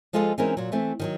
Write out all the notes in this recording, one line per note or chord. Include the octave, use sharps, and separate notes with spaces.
F3 G#3 F4 A4 D#5 F5
E3 G#3 C4 C#4 D#4 A#4
A#2 F#3
E3 A3 C4
D#3 F3 F#3